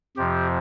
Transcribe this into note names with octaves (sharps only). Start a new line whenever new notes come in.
F2 C3 F3 G4